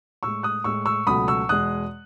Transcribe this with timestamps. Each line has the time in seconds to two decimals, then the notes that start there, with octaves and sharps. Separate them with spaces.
0.23 A2 G#3 C#6 E6
0.43 D#6 F#6
0.64 A2 G#3 C#6 E6
0.86 C#6 E6
1.07 C#2 B2 F#3 A3 B5 D#6
1.28 C#6 E6
1.49 E2 B2 G#3 D#6 F#6